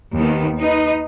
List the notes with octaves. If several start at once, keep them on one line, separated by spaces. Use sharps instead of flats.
D#2 D#3 B3
D#4 B4 D#5